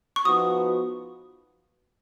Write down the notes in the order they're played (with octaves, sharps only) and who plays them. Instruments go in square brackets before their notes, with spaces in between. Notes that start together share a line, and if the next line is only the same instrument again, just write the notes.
[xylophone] C#6
[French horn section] F3 B3 D#4 F#4 [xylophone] D#6